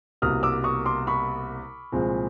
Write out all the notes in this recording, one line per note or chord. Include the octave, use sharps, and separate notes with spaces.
C2 B2 G3 A#3 D#6 F6
D6 E6
C#6 D#6
C6 D6
B5 C#6
C2 A#2 F3 G#3 C4